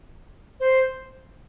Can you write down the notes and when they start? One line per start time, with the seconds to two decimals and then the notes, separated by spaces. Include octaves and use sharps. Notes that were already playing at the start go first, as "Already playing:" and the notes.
0.60 C5